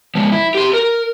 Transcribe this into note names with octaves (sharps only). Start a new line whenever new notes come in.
F3 G#3
E4
G4 C6
A#4